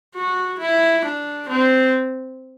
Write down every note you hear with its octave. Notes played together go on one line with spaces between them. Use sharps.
F#4
E4
D4
C4